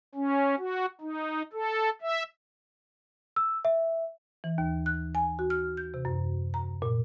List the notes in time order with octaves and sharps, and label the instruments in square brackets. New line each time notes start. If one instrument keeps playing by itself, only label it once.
[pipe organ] C#4
F#4
D#4
A4
E5
[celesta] E6
E5
[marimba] E3
D#2
F#6
G#5
F#4
F6
G6
C3
F#2
A#5
A#2